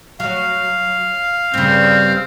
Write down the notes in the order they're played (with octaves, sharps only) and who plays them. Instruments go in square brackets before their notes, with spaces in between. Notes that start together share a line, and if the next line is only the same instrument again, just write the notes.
[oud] F#3 [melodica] F5
[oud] G2 C#3 [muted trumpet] C4